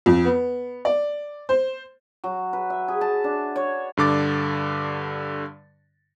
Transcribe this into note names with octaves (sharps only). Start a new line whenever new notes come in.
F2
B3
D5
C5
F#3
B4
E5
G#4
A5
D4
C#5
G2 D3 D6 A6